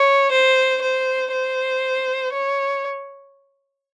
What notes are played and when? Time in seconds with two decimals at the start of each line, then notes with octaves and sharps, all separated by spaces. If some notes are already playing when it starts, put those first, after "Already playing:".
Already playing: C#5
0.31 C5
0.82 C5
1.32 C5
2.33 C#5